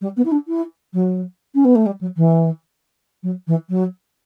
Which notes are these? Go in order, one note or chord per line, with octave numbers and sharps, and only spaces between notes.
G3
B3
E4
D4
E4
F#3
C#4
B3
A3
G3
F#3
E3
F#3
E3
F#3